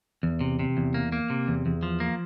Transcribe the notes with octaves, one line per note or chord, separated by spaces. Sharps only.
E2
C3
C3
E2
A#3
A#3
C3
E2
E2
F3
A#3